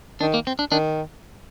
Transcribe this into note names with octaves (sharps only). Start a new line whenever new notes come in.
D#3 D4
A#3
C4
D4
D#3 D4